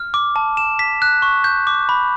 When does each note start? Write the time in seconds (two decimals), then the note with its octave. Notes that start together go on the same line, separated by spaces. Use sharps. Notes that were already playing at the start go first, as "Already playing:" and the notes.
Already playing: F6
0.14 D6
0.36 A5
0.57 E7
0.79 B6
1.02 F#6
1.22 C#6
1.44 G6
1.67 D6
1.89 B5